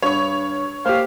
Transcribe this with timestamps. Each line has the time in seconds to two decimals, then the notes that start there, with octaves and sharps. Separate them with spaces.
0.02 G2 C#5 C#6
0.86 A#3 G4 C5 F5